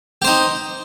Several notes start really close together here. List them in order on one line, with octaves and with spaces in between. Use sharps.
G4 C5 D#4